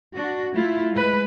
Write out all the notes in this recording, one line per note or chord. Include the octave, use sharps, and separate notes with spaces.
D4 F#4
A3 E4 F4
G#3 B4